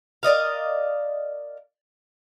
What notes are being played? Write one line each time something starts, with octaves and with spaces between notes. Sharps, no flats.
A#4 D5 D#5 F5